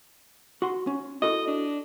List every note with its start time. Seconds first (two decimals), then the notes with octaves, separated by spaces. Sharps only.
0.62 F#4 F#5 C6
0.87 C#4
1.22 E4 F#4 A4 D#5
1.47 D4